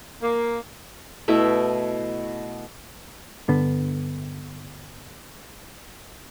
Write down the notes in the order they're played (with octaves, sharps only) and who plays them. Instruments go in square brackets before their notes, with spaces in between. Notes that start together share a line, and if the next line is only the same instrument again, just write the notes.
[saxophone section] A#3
[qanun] B2 A3 E4 E5
[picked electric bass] G2 D3 B3